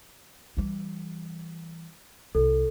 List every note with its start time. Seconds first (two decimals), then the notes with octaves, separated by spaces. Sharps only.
0.57 E3 G3
2.35 C2 A4